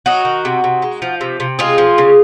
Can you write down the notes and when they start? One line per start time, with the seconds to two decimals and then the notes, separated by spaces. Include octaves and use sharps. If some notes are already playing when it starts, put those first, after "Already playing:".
0.06 F#3 D#4 F#4
0.25 D#3
0.45 C3
0.64 C3
0.82 G#3
1.02 F3
1.21 C3
1.40 C3
1.59 G#3 F4 G#4
1.78 F3
1.98 C#3